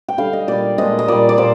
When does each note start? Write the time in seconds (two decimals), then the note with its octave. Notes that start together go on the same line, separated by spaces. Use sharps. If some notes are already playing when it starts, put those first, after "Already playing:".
0.08 G5
0.18 D3 G3 F5
0.33 D#5
0.48 A#2 G3 D5
0.78 A#2 F3 G#3 D#5
0.99 D#5
1.08 A#2 G3 D5
1.29 D5
1.38 A#2 C5